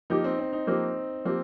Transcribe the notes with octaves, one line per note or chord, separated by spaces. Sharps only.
F3 A#3 D#4 G4
C4
C4
D#4
F3 A#3 C4 G4
F3 A#3 C4 G4